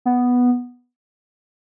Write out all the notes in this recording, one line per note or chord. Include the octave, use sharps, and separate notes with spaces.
B3